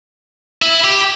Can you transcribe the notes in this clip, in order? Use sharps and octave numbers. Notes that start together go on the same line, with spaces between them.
E4
G4